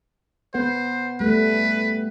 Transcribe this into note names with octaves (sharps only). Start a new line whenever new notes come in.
B3 B4 C5 F#5
G3 A3 B4